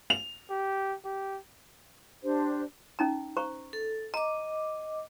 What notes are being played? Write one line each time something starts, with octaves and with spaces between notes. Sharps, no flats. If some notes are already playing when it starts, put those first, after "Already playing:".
F7
G4
G4
D4 G4 C5
C#4 D#4 A#5
C5 A#5 C#6
A4
D#5 A#5 D6